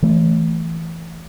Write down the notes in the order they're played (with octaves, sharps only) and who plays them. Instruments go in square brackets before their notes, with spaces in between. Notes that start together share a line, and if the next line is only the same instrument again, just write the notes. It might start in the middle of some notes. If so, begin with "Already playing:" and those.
[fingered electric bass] E3 A3